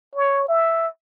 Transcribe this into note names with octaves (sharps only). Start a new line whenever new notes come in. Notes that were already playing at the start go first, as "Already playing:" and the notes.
C#5
E5